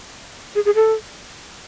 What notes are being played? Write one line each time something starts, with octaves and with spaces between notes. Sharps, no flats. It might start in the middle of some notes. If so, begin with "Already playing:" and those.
G#4
G#4
A4